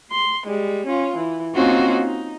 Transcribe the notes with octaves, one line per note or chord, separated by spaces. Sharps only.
C6
G3 G#3
C#4 F4
E3
A#3 C4 C#4 D#4 F4 F#4
D#4